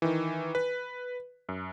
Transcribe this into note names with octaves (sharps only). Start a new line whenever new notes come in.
D#3 E3
B4
F#2